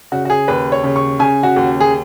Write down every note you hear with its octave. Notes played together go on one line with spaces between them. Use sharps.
C#3 F#4
F#4
G#4
D#2 B4
C#5
C#3
C#6
C#3 G#5
F#4
D#2
G#4